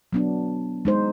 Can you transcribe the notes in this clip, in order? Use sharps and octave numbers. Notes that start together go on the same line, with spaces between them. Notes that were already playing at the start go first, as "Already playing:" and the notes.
F#3 B3 D4
G#3 D#4 C5